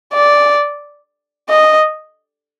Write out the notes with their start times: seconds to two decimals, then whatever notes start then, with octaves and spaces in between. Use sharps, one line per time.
0.14 D5
1.49 D#5